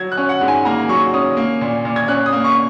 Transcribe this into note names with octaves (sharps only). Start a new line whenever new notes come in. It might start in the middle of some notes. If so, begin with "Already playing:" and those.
Already playing: F#3 G#6
F#6
C#4
F#5
G#2
G#5
A#3 A#5
F#3 C#6
C#4 D#6
A#3
A#2
A#2
G#6
C#4 F#6
D#6
A#3
C#6